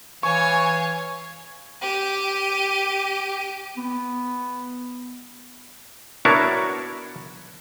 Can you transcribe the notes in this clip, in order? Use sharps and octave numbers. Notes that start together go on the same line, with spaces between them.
E3 C#5 F5 G#5 C#6
G4 D#7
B3
B3 D4 E4 F#4 A#4 C#5